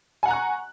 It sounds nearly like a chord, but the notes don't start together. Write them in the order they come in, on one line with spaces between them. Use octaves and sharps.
G#5 F#5 A#5 F#6 C#6